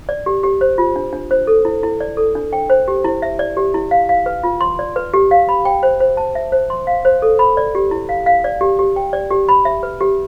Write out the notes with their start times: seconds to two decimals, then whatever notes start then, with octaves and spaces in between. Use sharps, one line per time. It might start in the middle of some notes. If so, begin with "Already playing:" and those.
0.09 D5
0.26 G4
0.44 G4
0.61 C5
0.78 F4
0.96 D4
1.13 D4
1.31 C5
1.47 A4
1.65 E4
1.83 E4
2.01 D5
2.17 A4
2.35 D4
2.53 G5
2.70 C5
2.88 G4
3.04 E4
3.22 E5
3.39 D5
3.57 G4
3.74 E4
3.91 F5
4.09 F5
4.26 B4
4.43 F4
4.61 C6
4.79 D5
4.96 B4
5.14 G4
5.31 F5
5.49 B5
5.65 G5
5.83 C5
6.00 C5
6.17 A5
6.35 E5
6.52 C5
6.70 C6
6.87 F5
7.05 C5
7.22 A4
7.39 B5
7.57 D5
7.75 G4
7.91 E4
8.09 F5
8.26 F5
8.44 D5
8.61 G4
8.79 G4
8.96 G5
9.13 D5
9.31 G4
9.49 B5
9.65 E5
9.83 B4
10.01 G4